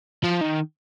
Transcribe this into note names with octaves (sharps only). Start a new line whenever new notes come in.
F3
D#3